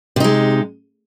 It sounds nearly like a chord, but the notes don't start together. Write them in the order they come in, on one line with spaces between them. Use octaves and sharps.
C3 D#4 G#3